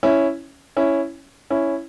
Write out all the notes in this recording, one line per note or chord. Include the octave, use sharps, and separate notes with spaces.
C#4 E4
C#4 E4
C#4 E4